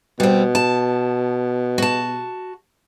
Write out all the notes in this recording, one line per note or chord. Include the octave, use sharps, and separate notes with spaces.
B2 G3 C4
A5
F#4 A5